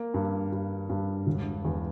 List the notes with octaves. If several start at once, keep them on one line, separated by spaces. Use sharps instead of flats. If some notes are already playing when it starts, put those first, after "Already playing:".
Already playing: A#3
G2
G2
G2
E1
E2